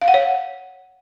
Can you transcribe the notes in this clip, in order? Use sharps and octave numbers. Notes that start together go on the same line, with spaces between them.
F5
F#5
C#5